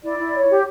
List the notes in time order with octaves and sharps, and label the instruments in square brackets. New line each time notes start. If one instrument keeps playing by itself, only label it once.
[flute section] E4 D5
E4
C#5
G4